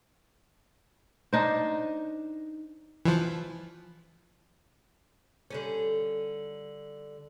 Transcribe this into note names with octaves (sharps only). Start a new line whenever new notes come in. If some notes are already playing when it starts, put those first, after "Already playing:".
D4 D#4 C5
E3 F3
D3 G3 C#4